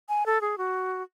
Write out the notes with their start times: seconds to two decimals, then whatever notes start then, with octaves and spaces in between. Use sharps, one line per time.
0.09 G#5
0.26 A4
0.41 G#4
0.58 F#4